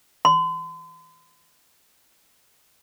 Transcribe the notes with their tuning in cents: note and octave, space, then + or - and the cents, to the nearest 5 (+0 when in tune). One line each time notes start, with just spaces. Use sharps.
C6 -40